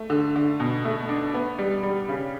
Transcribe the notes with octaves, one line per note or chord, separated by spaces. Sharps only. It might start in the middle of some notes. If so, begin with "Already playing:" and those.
Already playing: A3
D3
D3
B2
A3
D4
B3
G3
G3
C#3